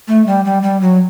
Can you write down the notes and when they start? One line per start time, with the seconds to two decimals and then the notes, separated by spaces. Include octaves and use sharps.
0.08 A3
0.26 G3
0.45 G3
0.63 G3
0.81 F#3